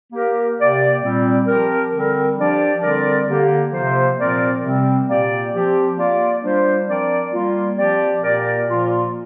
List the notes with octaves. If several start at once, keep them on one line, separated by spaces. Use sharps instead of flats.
A#3 G4 A#4
C3 A#3 G4 D5
A#2 G3 C4
F3 C4 G4 A#4
D3 G3 C4 A#4
F3 D4 G4 D5
D3 G3 C4 A#4 D5
D3 A#3 G4
C3 F3 A#3 F4 C5
A#2 F3 C4 A#4 D5
C3 G3 C4
A#2 A#3 G4 D5
F3 C4 G4
A#3 F4 D5
G3 D4 F4 C5
F3 C4 A#4 D5
G3 A#3 F4
F3 C4 G4 D5
A#2 A#3 G4 A#4 D5
A#2 F3 A#3 F4